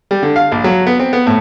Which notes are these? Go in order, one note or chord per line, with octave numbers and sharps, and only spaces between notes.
G3
D3
F5
A#1
F#3
B3
C4
B3
A2